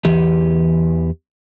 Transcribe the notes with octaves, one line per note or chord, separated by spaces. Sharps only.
E2 E3 G4